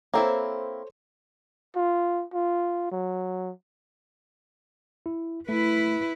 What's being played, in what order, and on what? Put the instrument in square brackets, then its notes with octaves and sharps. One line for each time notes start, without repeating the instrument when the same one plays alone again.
[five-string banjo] A#3 C4 E4 [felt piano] A4 C5 C#5
[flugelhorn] F4
F4
F#3
[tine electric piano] E4
[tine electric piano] A3 [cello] E4 B4